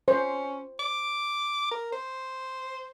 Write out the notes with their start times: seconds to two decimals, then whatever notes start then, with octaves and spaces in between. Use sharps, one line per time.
0.08 C#4 C5
0.80 D6
1.72 A#4
1.93 C5